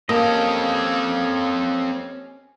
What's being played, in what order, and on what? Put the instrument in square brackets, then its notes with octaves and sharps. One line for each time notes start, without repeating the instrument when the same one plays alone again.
[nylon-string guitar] A#3 [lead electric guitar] C4 A4 [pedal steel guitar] C#4 G4 D#5 [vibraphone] F5 D#6